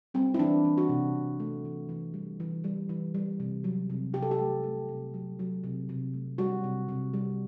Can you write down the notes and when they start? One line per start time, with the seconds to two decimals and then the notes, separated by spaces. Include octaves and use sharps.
0.14 G3 C4
0.34 E4
0.39 E3 D4
0.65 E3
0.78 F#4
0.89 C3
1.15 C3
1.40 A3
1.65 E3
1.89 E3
2.14 G3
2.40 E3
2.64 G3
2.89 E3
3.15 G3
3.40 C3
3.64 F#3
3.90 C3
4.13 C3 G4
4.22 A4
4.31 G4
4.39 A3
4.64 A3
4.89 C3
5.14 F#3
5.39 F#3
5.64 C3
5.89 C3
6.14 A3
6.38 G3 F#4
6.64 C3
6.89 C3
7.14 G3